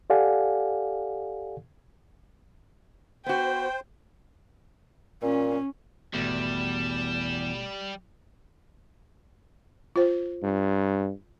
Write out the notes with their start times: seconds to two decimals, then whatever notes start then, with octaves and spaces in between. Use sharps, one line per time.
0.10 G4 A4 D5 F5 F#5 G#5
3.26 B3 F#4 C5 G5
5.23 A#2 C#4
6.14 G#1 E2 B2 G3 A3 E7
9.96 F4 C5
10.43 G2